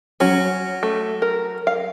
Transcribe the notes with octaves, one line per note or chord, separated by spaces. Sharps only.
F#3 C#4
A3
A#4
F5